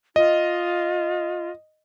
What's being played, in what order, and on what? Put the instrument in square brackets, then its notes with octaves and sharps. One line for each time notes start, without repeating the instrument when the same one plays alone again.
[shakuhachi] F4 [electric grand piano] D#5